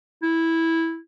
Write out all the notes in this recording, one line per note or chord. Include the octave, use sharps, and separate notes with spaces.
E4